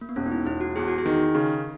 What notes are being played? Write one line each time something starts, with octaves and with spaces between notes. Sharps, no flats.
A#3
B3
E1 C#4
D#4
E4
E1 E4
F#4
E2 G#4
F#4
G#4
D#3
C#3